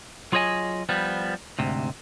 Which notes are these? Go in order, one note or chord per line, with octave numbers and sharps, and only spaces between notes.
F#3 F4 G#4 C#5 D#5 G#5
F3 G3 B3
D2 G#2 C3